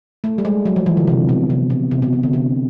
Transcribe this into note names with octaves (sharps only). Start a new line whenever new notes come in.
A3
G3
G#3
F#3
F3
E3
D3
C3
B2
C3
B2
C3
B2
C3
D3
C3